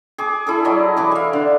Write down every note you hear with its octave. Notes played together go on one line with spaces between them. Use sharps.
G#4 D6
E4 G#4 A4
F#3 E4 D5 D#5
E3 G#4 D6
E5 F5
D3